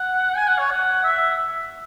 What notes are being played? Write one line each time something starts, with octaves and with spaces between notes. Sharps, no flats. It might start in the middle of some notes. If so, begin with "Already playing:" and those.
Already playing: F#5
G#5
F#5
C#5
F#5
E5